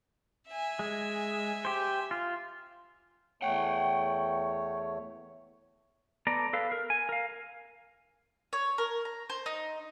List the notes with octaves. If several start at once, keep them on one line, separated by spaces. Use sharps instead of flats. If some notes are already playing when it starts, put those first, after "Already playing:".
E5 G#5
G#3
G4 C5
F4
E2 A3 C#5 F#5 G5
B3 A4 D5 A#5
A4 B4 F5
A#4
G#5
A#4 F5
C#5
A#4
A#5
C5
D#4